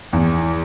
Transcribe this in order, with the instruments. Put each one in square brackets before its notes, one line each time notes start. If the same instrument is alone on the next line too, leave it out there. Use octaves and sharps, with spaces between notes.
[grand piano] E2